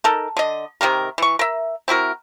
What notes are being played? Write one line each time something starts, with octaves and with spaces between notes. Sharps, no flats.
D#4 A4 A#4
D3 D#5
C3 D#3 G4 A#4
E3 C#6
A#4 E5
C4 E4 F#4 A#4